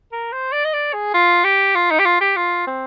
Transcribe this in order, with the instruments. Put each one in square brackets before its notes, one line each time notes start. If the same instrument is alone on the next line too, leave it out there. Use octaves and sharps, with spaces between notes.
[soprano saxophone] A#4
C5
D5
D#5
D5
G#4
F4
G4
F4
D#4
G4
F4
G4
F4
C4